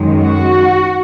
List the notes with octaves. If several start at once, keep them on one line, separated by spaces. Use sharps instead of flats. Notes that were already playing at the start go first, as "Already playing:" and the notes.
Already playing: F#2 D#3 G#3
F#4